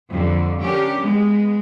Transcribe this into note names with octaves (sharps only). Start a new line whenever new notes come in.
F2 D3 G3
C#4 D4 G4 A#4
G#3 B3